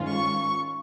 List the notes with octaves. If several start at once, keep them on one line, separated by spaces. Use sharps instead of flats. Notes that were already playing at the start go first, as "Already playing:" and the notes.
Already playing: G#2 D#3 C#4 F4
C#6